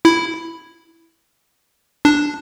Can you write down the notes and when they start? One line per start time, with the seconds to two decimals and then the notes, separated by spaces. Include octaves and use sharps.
0.05 E4
2.05 D4